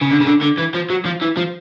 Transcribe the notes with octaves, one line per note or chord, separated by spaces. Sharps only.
C#3
D3
C#3
D3
D3
E3
F3
F#3
F3
E3
F3